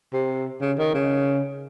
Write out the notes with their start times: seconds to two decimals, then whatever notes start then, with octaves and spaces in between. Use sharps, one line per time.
0.13 C3
0.61 C#3
0.79 D#3
0.94 C#3